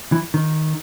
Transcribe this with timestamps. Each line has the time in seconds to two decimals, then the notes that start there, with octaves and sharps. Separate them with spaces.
0.12 E3
0.34 D#3